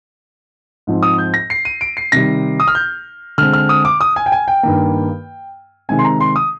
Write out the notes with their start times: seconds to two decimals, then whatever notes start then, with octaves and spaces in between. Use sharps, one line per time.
0.87 G#2 F3 C4
1.03 D#6
1.18 G6
1.34 A#6
1.50 C7
1.65 D#7
1.81 D7
1.97 C7
2.12 C3 D#3 G3 A#6
2.60 D#6
2.68 F6
2.75 G6
3.38 D3 G#3 C4 F6
3.53 F6
3.69 D#6
3.85 D6
4.01 D#6
4.16 G#5
4.26 G5
4.32 G#5
4.48 G5
4.63 G2 D#3 A#3
5.89 C3 D#3 G#3 C4 G#5
5.99 C6
6.05 A#5
6.21 C6
6.36 D#6